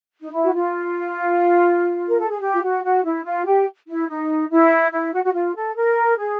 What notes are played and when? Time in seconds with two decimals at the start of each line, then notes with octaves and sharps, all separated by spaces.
0.21 D#4
0.33 E4
0.43 F#4
0.53 F4
2.08 A#4
2.19 A4
2.30 G#4
2.41 G4
2.53 F4
2.62 F#4
2.84 F#4
3.04 E4
3.24 F4
3.46 G4
3.88 E4
4.08 D#4
4.50 E4
4.92 E4
5.14 F#4
5.24 F#4
5.33 F4
5.54 A4
5.76 A#4
6.18 G#4